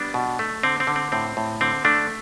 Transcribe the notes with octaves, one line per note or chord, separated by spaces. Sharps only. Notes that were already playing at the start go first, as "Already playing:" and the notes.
Already playing: G3 B3 D4
B2
A3
D3 C4
C4
D3
C4
A2 C4
A2
D3 C4
A3 D4